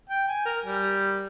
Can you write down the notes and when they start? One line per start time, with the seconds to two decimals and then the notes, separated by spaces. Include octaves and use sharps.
0.09 G5
0.28 G#5
0.45 A#4
0.65 G3